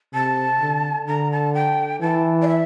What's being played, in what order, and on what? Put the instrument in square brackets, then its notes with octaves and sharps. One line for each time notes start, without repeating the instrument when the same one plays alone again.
[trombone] C3 [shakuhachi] A5
[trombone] D3
[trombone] D3 [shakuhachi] A#5
[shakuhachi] A5
G5
[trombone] E3 [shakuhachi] A5
[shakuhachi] D5
E5